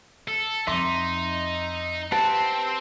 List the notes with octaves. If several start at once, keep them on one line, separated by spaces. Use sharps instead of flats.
A4
F2 D#4 E5 C6 D6
C4 G4 B4 F#5 A5